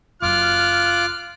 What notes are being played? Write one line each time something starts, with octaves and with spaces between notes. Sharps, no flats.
F#1 F#2 F4 D6 F6 F#6